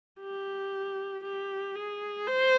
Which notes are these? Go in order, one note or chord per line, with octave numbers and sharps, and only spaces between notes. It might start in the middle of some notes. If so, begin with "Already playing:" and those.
G4
G4
G#4
C5